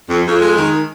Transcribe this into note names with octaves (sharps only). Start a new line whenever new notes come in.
F2
F2
G#3
D#3